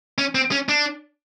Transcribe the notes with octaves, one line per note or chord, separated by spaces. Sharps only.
C#4
C4
C#4
D4